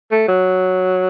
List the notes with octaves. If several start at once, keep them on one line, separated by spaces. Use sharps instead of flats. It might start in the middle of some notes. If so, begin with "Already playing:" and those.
A3
F#3